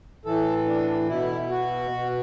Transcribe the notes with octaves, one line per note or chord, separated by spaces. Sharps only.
A2 E3 A4
D4
B2 E4
F#4
B2